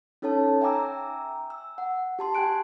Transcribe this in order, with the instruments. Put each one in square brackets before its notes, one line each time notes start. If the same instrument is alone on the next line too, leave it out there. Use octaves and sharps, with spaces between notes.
[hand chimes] C#4 D#4 A4 C#5 A5
E5 G5 G#5 A#5 D6 E6
E6
F#5
G4 A5 C6
G4 G5 G#5 F#6 D7